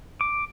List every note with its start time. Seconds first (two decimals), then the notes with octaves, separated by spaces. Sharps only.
0.21 D6